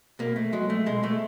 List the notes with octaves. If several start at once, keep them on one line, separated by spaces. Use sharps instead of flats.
B2 A#3
A3
F#3 G#3
A3
B2 G#3
A3